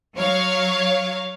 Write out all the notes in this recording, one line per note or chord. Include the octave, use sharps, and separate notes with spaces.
F#3 C#5 F5